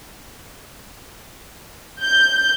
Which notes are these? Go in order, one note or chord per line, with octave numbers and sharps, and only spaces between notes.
G6